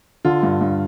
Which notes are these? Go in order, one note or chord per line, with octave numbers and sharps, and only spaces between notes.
D3 F4
G2
G2